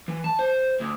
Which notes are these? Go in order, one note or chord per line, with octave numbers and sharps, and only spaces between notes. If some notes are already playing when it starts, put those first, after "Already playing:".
E3
A5
C5
D2